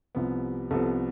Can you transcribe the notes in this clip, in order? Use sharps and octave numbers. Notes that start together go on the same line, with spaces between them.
C2 C3 F3 B3
C2 C3 F3 B3 A4